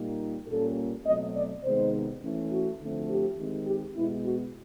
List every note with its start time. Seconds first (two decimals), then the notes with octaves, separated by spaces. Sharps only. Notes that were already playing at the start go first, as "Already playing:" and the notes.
Already playing: A#2 G3 A#3 D#4
0.48 A#2 G3 A#3 C#4 A4
1.06 B2 F#3 A3 C4 D#5
1.35 D5
1.64 C3 D#3 G#3 B3 D#4 C5
2.22 E3 A3 C#4
2.51 F#4
2.80 D3 F3 A3 C4
3.09 G4
3.38 D#3 G#3 C4
3.67 G4
3.96 B2 G#3 B3 E4
4.26 F#4